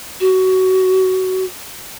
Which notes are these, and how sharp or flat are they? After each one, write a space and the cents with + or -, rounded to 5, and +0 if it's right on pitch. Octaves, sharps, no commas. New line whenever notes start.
F#4 +20